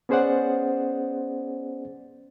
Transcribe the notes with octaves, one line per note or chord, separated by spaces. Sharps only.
B3 C#4 G#4 C5 D5 F#5